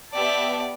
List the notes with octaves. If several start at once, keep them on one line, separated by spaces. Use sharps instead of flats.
B3 G4 D5 E5 A5